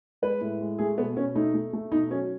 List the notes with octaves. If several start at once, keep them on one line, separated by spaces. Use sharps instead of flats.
G#3 B4
A2
G#3
A3 G#4
B2 B3
B2 C#4
A3 D#4
A3
A3
B2 D#4
F#3 C#4